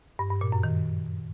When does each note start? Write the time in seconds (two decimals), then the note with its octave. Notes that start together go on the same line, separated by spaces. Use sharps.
0.19 G2
0.30 G2
0.41 A#2
0.52 F#2
0.63 D#3